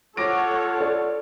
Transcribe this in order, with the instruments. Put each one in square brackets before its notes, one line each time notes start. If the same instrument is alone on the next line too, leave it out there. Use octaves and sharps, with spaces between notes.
[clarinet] F4 [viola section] A4 C#5 F#5 [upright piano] D6 A#6 D7
[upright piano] A4 D5